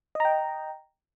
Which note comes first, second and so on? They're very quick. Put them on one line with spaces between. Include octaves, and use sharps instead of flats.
D#5 A#5 G5